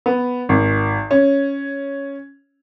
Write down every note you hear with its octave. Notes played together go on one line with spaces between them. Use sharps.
B3
G#1
C#4